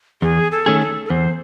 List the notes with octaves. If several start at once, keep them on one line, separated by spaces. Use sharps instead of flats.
E2 G#4
A4
D#3 A3 C#4 G#4
A4
A4
E2 C5